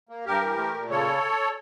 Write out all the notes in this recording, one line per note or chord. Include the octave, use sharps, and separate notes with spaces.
A#3
G2 G4 A#4
E3
A3
A#2
C#3 A4 C#5